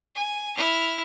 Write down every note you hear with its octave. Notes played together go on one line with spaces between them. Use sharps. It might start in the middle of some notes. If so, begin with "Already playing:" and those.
G#5
E4 F6